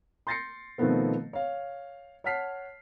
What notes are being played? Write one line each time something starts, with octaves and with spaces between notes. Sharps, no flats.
C6 G6 A6 A#6 C7 C#7
B2 D#3 F3 A3 B3 C4
C#5 F5
C#5 F#5 A5 F6 B6 C7